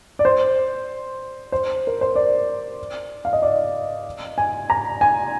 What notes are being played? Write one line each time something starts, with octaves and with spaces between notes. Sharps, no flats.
D5
C5
C5
A#4
C5
D5
F5
D#5
D5
G#5
A#5
G#5